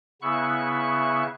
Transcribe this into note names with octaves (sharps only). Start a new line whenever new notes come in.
C#3 B3 E4 E5 C#6 F#6